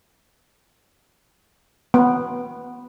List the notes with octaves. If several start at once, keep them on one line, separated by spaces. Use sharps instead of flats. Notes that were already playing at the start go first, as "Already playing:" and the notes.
B3